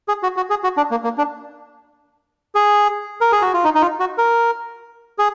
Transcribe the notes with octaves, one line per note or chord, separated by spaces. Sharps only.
G#4
F#4
F#4
G#4
F#4
D4
A#3
A#3
D4
G#4
A#4
G#4
F#4
F4
D#4
D#4
F4
F#4
A#4
G#4